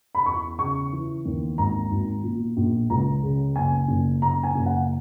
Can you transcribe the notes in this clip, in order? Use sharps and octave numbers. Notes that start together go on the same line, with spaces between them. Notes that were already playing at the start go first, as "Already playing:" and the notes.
B5
E2 C#6
C#3 C#6
E3
D#2
G#1 A#5
G#1
A#2
A#1
C#2 A#5
C#3
F#1 G#5
F#1
F#1 A#5
G#5
F#1
F#5